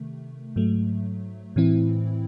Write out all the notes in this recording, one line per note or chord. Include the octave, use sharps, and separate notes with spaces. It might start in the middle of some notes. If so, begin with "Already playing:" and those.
Already playing: C3 D#3 A3
G#2 F#3 A3
A2 E3 C4 E4